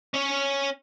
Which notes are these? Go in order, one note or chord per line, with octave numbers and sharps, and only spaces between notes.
C#4 C#5